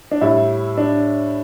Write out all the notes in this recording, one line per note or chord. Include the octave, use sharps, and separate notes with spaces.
D4
A2 G3 E4
D4